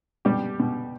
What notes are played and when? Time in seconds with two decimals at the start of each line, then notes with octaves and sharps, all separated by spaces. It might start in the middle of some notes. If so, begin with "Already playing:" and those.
0.25 B2 G3 G4
0.60 B2